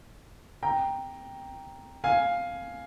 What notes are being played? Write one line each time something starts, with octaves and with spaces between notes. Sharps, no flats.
G5 A#5
F5 G#5